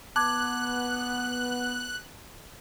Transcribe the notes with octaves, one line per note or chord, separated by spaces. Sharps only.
B3 A5 D6 F#6 G#6